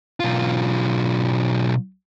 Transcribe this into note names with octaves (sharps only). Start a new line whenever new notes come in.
B1 F4